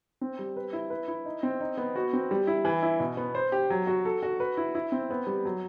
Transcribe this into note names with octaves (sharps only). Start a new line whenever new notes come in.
C4
G3
B4
E4
B4
E4
D#4
C4
D#4
B3
F#4
C4
G3
E4
E3
E4
B2
B3
C5
G4
F#3
F#4
A4
F#4
B4
E4
E4
C4
B3
G3
F#3